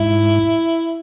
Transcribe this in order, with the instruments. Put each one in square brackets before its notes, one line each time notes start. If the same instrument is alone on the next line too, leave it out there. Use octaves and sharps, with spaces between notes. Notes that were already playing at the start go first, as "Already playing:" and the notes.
Already playing: [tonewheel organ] G#2 [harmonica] E4